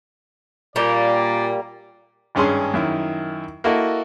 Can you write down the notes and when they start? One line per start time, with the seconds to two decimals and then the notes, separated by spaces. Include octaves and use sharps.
0.76 A#2 G3 A#3 D5
2.35 G#1 G2 C#4 G#4 C6
2.74 F#2 D#3 E4
3.64 A#3 E4 F#4 A4 D#5